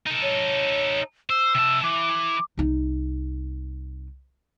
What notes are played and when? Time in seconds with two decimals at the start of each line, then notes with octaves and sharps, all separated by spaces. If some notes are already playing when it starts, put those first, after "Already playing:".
0.07 D#4 A4
0.22 C#5
1.30 C5 E6
1.55 C3 A5
1.83 E3 D6
2.58 C2 D#4